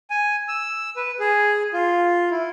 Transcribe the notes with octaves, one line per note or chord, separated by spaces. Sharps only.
G#5
E6
B4
G#4
F4
E4